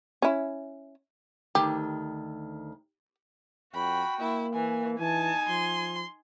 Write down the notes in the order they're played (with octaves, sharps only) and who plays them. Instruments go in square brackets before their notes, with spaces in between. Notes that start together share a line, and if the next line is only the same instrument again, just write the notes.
[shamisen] C#4 E4
[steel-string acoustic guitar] D2 D#3 [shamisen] G4
[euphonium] F2 [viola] F#4 G5 [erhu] B5
[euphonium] A#3 [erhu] E4
[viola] E3 [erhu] G#5
[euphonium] E3 [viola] D#4 G#5 [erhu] A5
[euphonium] F3 [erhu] C6